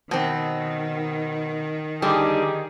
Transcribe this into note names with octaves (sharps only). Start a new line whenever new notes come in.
B2 D#3 C4
D3 G3 D#4 G4 G#4